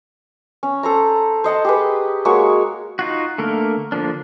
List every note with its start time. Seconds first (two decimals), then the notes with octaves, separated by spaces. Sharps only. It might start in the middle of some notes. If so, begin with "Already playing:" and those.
0.63 C#4
0.83 A4 C5 A#5
1.44 C5 D#5 F#5 A5
1.64 G4 G#4 B4
2.25 G#3 A#3 F#4 C#5
2.99 D#4 F4 F#4
3.38 D3 A3 A#3 A#4
3.92 D3 F3 A#3 D4